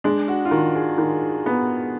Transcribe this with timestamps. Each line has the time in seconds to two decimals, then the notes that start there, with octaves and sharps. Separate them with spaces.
0.04 G#3 D4
0.28 F#4
0.45 F4
0.51 D#3 F#4
0.75 G#4
0.98 D#3
1.46 B3